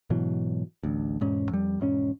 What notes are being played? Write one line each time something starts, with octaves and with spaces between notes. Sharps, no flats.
G#2 B2 E3 F#3
A1 D2
E1 G#2 C#4
F2 G3
E1 G#2 C4 C#4